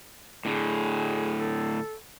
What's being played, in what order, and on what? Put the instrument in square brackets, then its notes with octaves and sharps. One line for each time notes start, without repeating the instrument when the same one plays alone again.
[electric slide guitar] A2 D3 [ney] G#4
[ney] A4